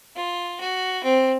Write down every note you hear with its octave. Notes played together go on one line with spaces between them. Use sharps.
F4
F#4
C4